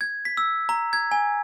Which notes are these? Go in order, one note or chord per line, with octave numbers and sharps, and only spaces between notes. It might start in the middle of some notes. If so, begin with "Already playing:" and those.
G#6
B6
E6
A#5
G#6
G#5